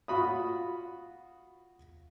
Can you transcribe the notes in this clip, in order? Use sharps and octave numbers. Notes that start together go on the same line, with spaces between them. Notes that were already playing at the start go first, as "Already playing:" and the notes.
F4 F#4 B5 D#6